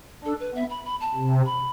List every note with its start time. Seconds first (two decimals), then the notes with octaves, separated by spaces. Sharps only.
0.24 D4 A4
0.40 B4
0.55 B3 E5
0.70 B5
0.85 B5
1.01 A5
1.15 C3
1.46 B5